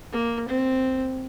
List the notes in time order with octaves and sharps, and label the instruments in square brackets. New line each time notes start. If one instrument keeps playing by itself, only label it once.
[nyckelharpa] A#3
C4